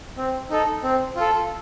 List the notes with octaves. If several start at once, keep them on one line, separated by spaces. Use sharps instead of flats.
C4
D#4 A4
C4
F4 A4